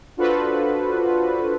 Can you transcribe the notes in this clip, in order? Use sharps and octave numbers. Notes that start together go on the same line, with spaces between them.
D4 F4 F#4 A4 B4 C5